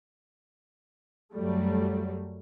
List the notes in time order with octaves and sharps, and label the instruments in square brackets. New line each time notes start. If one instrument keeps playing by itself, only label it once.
[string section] F#2 F#3 G3 A3